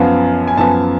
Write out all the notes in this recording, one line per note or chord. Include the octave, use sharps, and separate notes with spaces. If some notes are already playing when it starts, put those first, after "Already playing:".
Already playing: F#2 F3 B3 F5
G#5
F#2 F3 B3 A5